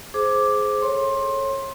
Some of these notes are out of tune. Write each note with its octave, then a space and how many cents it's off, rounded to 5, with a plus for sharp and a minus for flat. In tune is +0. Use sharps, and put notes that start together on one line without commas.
G#4 +15 C5 +0 D6 +0
A4 +0 C#5 -25 C6 +20